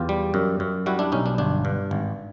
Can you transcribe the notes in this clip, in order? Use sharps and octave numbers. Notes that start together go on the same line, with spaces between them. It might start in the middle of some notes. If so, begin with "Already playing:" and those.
Already playing: E2 F4 G4
G3
F#2
F#2
G3 E4 F#4
D4 E4
B1 C#4 D#4
D4
G1 D4
G2
G#1